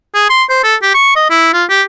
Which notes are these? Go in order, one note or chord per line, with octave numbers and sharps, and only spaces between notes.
G#4
C6
C5
A4
G4
C#6
D#5
E4
F4
G4